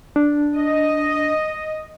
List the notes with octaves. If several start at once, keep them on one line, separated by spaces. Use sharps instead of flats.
D4
D#5